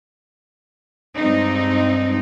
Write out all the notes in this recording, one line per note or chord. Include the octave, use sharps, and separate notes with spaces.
G2 G#3 C4 D#4